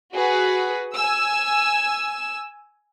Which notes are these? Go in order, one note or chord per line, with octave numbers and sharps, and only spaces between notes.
F#4 G#4 B4
G#5 E6